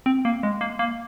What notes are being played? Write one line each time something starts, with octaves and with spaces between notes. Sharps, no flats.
C4
A#3
G#3
A#3
A#3